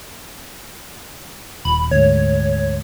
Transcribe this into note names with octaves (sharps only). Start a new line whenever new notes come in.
D#1 B5
D2 G#2 C#5